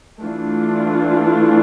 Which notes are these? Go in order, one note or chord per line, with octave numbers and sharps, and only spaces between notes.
E3 A3 D4 F4